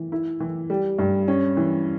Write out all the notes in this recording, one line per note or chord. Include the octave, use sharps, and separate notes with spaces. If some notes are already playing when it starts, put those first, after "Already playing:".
Already playing: E3
E4
E3
G3
G2
C#4
E3